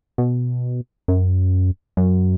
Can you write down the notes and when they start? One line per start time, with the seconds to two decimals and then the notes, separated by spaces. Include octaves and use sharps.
0.18 B2
1.08 F#2
1.97 F#2